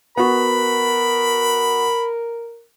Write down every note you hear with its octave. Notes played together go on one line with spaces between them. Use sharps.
B3 F#4 A#4 B5